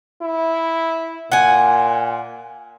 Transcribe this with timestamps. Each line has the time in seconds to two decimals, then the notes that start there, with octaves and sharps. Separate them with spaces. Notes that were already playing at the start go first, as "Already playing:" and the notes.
0.22 E4
1.32 A#2 F#5 G#5